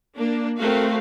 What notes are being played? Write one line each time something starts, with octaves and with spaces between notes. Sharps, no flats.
A#3 D4
A3 C4 F#4 A#4 F5